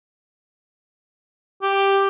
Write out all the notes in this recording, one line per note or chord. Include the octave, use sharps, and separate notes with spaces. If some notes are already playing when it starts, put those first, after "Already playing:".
G4